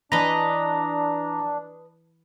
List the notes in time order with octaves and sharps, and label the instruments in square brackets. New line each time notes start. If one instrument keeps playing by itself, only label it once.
[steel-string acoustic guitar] E3 [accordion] D4 [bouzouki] B4 D#5 [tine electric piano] A#5